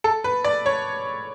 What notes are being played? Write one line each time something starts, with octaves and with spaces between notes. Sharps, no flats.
A4
B4
D5
C#5